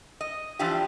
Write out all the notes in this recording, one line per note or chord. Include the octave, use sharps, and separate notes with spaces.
D#5
E3 F3 G3 D4 F4 G4